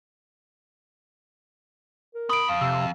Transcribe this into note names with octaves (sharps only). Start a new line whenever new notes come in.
A#4
C4 B5 D#6 D7
F2 F5
C3 E6